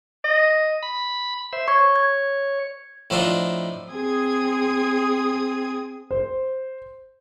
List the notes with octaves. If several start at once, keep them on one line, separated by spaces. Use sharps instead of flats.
D#5
B5
C5 E5
C#5 C#6 G#6
G#6
A2 F3 A3 D4 D#4 F4
C4 G#4 D#6 G#6
C5